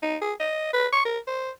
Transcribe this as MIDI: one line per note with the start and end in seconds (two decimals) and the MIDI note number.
0.02 0.17 63
0.21 0.33 68
0.40 0.72 75
0.73 0.87 71
0.92 1.02 85
1.05 1.18 70
1.27 1.50 72